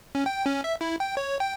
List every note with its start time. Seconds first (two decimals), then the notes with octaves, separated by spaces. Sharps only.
0.15 C#4
0.26 G5
0.46 C#4
0.64 E5
0.81 E4
1.00 G5
1.17 C#5
1.40 G5